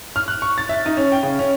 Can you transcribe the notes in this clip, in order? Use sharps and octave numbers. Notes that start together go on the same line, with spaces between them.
F6
F#6
C#6
A6
E5
D#4
C#4
G5
C#3
C#4